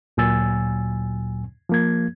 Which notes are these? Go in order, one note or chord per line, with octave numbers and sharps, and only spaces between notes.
D2 A#2 F#3 G#5 E6 A6
F3 A#3 G#6